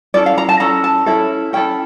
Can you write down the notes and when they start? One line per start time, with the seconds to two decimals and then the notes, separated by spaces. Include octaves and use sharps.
0.14 C#4 E4 A4 D5
0.26 F5
0.38 A#5
0.49 A5
0.60 C#4 E4 A4 A#5
0.84 A5
1.06 C#4 E4 A4
1.53 C#4 E4 A4 G5